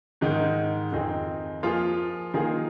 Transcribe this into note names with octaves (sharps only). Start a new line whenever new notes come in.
G#2 D#3 G#3
F2 D#3 C4 D#4 G#4
F3 A#3 F4 G#4
D#3 A#3 F4 G#4